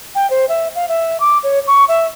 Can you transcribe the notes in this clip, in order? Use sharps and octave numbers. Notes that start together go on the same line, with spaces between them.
G5
C5
E5
F5
E5
D6
C#5
C#6
E5